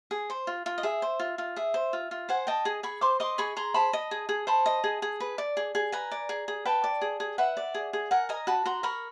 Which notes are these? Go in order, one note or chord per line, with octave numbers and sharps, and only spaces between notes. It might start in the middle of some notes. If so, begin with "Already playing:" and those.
G#4
C5
F4
F4
D#5
G#4 E5
C5
F4
F4
G#4 E5
C5
F4
F4
C5 F#5 G#5
D#5 G5 A5
G#4
G#4 B5 C#6
C5 C6 D6
D#5 C6 D6
G#4 B5 C#6
G#4 A#5 C6
C5 A5 B5
D#5
G#4
G#4
C5 A5 B5
D#5
G#4
G#4
B4
D5
G#4
G#4
B4 G#5 A#5
D5
G#4
G#4
B4 G5 A5
D5
G#4
G#4
B4 E5 F#5
D5
G#4
G#4
A#4 F#5 G#5
D#5 G#5 A#5
F#4 A5 B5
F#4 A#5 C6
A#4 B5 C#6